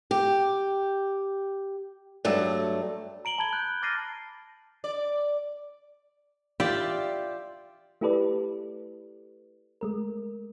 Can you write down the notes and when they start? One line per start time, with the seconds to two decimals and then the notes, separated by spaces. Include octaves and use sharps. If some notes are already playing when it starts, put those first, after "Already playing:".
0.11 G4
2.25 G2 F#3 A3
3.25 A#5 D7 F#7 G7
3.38 A5 B5 G#6 G7
3.53 F#6 G6
3.82 D6 F6 A6 A#6 C7 D#7
4.84 D5
6.60 F4 G4 D5 E5 F5
8.01 A3 E4 G4 A4 B4 D5
9.81 G#3 A3 A#4